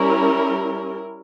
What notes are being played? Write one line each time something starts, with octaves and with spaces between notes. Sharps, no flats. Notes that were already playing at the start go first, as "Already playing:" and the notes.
Already playing: G3 C#4 E4 A#4